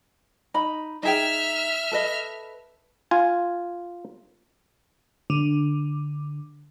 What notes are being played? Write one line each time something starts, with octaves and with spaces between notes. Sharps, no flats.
D#4 B5
D#4 G#4 E5 G5 F6
A4 B4 D#5
F4 G#5
D3